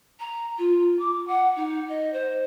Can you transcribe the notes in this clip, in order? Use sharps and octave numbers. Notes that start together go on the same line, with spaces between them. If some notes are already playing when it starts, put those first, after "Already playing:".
A#5
F4
D6
F#5
D#4
D#5
C5